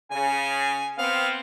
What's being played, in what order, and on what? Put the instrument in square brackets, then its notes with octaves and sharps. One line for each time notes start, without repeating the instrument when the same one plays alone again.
[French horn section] C#3 [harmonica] G#5
[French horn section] B3 C4 [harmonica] F5